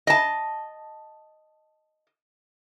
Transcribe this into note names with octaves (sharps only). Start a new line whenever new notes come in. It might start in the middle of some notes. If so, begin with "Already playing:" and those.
D#5 A5